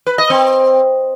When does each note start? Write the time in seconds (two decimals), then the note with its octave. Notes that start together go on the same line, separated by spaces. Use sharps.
0.07 B4
0.18 D#5
0.30 C4